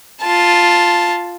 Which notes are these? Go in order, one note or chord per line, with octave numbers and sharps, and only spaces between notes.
F4 A5